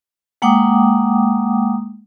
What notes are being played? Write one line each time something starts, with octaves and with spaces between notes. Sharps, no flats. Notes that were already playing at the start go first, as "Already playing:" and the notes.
G#3 A#3 F#5 G5 D6 D#6